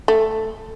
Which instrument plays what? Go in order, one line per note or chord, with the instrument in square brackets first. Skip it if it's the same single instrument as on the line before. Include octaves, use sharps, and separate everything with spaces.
[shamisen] A3